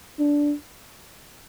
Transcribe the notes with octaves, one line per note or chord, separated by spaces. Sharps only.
D4